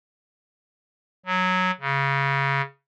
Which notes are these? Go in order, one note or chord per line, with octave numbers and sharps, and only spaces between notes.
F#3
C#3